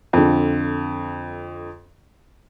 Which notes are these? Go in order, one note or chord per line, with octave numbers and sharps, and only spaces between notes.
F2 D3